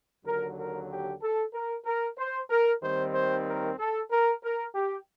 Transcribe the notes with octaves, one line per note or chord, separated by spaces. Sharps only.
D#2 D3 F#3 A#4
A#4
G4
A4
A#4
A#4
C5
A#4
D#2 D#3 G3 C4 C5
C5
A#4
A4
A#4
A#4
G4